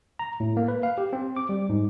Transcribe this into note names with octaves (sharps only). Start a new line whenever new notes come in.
A#5
A2
A#3
B4
F5
G4
C4
D6
G3
G#2